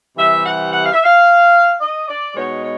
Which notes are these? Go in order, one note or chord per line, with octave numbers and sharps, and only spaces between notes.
C3 E3 G3 E5
F#5
F#5
F5
E5
F5
D#5
D5
B2 G#3 B3 D#4 C#5
C#5